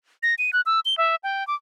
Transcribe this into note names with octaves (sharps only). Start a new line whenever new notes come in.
A#6
D#7
F#6
E6
G7
E5
G5
D6